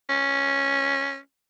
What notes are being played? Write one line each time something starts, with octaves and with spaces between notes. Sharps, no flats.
C#4